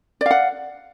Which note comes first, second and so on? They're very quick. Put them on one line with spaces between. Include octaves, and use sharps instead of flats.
D5 F5 F#5